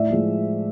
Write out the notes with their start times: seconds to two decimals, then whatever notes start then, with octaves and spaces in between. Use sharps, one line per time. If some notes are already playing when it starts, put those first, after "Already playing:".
Already playing: A2 D5 E5
0.10 F3 G#3